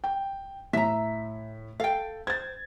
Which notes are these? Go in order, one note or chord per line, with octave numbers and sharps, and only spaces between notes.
G5
A2 E5 A#5 B6
A4 F5 G5
C5 G#6 A6